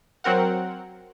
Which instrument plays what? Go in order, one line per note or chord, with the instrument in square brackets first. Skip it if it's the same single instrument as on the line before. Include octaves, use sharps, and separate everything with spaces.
[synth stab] F#3 C4 A#4 F#5